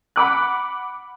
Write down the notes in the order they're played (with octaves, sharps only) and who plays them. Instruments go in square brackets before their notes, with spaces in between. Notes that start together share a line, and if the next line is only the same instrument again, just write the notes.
[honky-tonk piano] F#5 B5 D6 F#6